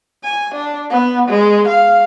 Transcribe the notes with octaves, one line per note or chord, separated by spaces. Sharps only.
G#5
D4
B3
G#3
F5